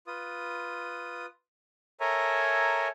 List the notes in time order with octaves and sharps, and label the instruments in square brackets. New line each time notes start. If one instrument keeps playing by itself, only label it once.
[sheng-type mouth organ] F4 B4 D#6
A4 A#4 C#5 E5 G#5 A#5